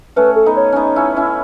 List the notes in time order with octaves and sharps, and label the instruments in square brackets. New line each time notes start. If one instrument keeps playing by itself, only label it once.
[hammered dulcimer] A3 C#4 [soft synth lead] B4
[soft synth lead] A4
[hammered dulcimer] B3 D#4
[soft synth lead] C#5
[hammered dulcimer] B3 C#4 D#4
C#4 E4
C#4 E4